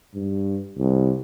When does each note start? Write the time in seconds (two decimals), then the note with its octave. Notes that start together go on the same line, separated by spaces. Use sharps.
0.15 G2
0.78 C2